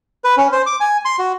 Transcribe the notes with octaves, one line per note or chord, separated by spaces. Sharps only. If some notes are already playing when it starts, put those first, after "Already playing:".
B4
C#4
C5
D6
G#5
C6
F#4